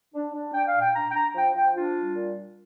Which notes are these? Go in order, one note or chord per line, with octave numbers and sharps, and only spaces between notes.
D4
D4
D4 G5
F5
A#2
G5
D4 A#5
G5
D4 A#5
F3 G5
F3 G5
D4 F4
G3
A#2